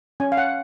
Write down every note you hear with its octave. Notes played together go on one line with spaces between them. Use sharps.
C#4 G#5
F5
F#5